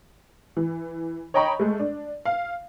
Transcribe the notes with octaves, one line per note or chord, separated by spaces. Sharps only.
E3
C#5 D#5 G5 A#5 B5 C#6
G#3 A3
D4
F5